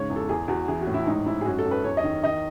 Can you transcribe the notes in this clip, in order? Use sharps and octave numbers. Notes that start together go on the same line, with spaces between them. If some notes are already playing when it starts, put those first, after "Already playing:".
Already playing: G#2 C#3 C#5
E2
A4
E2 G#4
E2 F#4
E3 G#4
F#4
A2
E4
G#2 D#4
G#2 E4
G#4
F#2 F#4
A4
F#2
B4
E2 C#5
D#5
D#3
D#3 D#5